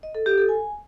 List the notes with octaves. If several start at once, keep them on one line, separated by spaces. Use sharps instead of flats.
D#5
A4
G4
A4
G#5